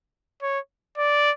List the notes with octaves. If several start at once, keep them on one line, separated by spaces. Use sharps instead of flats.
C#5
D5